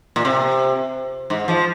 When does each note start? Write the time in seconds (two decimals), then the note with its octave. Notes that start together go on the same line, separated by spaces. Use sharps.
0.16 A#2
0.25 C3
1.30 G#2
1.48 F3